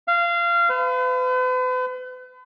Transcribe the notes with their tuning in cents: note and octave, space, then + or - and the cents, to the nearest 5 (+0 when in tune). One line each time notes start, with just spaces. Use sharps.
F5 -25
B4 +40